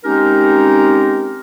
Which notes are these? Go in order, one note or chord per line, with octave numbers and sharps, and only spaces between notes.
G#3 C4 C#4 D#4 G4 A#4